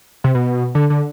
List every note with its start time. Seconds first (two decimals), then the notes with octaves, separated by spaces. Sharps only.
0.24 C3
0.35 B2
0.75 D3
0.90 D3